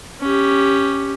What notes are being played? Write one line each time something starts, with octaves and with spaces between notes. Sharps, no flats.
C#4 G4